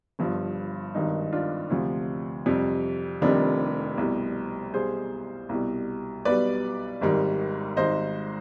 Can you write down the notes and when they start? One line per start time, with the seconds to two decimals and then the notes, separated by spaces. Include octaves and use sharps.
0.19 G1 G2 F3
0.94 G#1 G2 D#3 D#4
1.33 D4 F4
1.70 D2 C3 F3
2.46 F2 C3 G3
3.22 F1 F2 C3 D#3 G3 D4
3.98 C2 B2 G3
4.73 B1 B2 G3 G#4 C5
5.49 C2 B2 G3
6.25 B1 B2 G3 B4 D5
7.01 G#1 G#2 D#3 G3
7.77 G#1 G#2 G3 C5 D#5